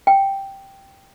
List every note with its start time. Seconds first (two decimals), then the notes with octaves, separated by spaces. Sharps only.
0.07 G5